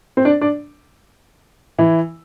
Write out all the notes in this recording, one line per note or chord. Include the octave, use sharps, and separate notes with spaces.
C4 C5
D4 D5
D4 D5
E3 E4